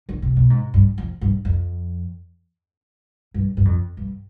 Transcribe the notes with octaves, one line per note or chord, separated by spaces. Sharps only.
D3
C3
B2
G#2
G2
F2
G2
F2
G2
G2
F2
G2